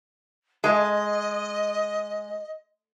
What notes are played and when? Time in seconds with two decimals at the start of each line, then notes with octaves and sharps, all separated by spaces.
0.64 G#3 D#5